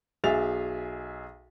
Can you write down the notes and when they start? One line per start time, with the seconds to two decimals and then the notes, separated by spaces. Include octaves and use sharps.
0.24 B1 G#4 E5 A6 F7